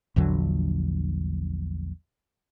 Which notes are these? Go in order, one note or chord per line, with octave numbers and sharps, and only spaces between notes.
A#1 E2 D3 F#3